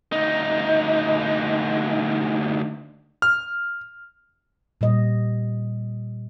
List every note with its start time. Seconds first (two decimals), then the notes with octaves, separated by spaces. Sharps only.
0.12 D2 D#4
3.22 F6
4.81 A#2 G3 D#5